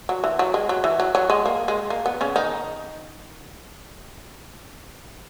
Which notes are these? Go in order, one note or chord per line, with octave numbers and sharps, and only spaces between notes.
F#3
E3
F#3
G#3
F#3
E3
F#3
F#3
G#3
A#3
G#3
A#3
B3
C#3 C#4
D#3 D#4